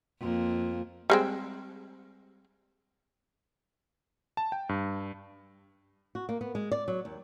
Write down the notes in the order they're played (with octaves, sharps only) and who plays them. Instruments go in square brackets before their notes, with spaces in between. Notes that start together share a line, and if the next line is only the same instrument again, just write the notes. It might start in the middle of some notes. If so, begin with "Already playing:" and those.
[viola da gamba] F2 A#3
[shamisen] G3 G#3 C4
[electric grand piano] A5
G5
G2
[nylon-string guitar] F#4
A#3
B3
G#3
D5
F#3
D#2